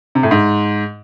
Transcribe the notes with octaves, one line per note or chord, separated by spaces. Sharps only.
C3
A2
G#2